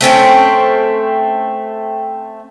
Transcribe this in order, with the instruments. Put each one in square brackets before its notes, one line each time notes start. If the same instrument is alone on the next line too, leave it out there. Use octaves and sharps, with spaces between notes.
[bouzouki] A3 C4 C#4 G5